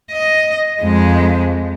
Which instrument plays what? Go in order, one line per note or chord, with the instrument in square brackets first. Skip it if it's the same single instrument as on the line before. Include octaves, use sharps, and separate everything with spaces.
[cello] D#5
F2 G#3